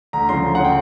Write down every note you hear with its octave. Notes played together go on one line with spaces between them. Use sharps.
D2 A#5
C#3 F3 C6
D2
F#5
C#3 F3 G5